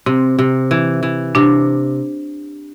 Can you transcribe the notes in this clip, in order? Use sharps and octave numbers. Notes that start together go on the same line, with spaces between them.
C3 C4
C3
E3
E3
C3 D4